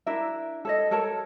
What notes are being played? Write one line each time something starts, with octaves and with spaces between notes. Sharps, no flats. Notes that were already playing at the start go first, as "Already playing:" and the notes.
D4 E4 A#4 E5
A4 C#5 D#5
A4 A#4 C#5 A5